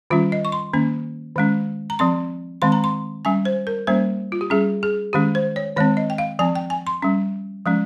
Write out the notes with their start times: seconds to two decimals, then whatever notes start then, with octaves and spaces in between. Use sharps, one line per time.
0.10 D#3 G3 C#4 F4
0.32 D#5
0.45 C#6
0.52 C6
0.73 D#3 A#3 C#4
1.36 D#3 G#3 C#4
1.90 A#5
1.99 F3 C4 C6
2.62 D#3 G#3 C4 C6
2.72 A#5
2.84 C6
3.25 G3 C#4 G#5
3.45 C5
3.67 A#4
3.87 G3 A#3 C#4 C5
4.32 F4
4.41 G4
4.50 G3 C#4 G#4
4.83 G#4
5.13 D#3 G#3 C#4 G4
5.35 C5
5.56 C#5
5.76 D#3 G#3 C4 C#5
5.97 D#5
6.10 G5
6.18 F5
6.39 F3 C4 G#5
6.55 G5
6.70 G#5
6.87 C6
7.02 G3 C#4
7.66 F3 G#3 C#4